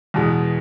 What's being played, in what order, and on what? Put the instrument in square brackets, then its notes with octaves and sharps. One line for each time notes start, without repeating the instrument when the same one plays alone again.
[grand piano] E2 B2 G#3